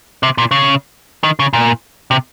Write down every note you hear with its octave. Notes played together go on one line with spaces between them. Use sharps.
C3
A#2
C#3
D#3
C#3
A#2
C3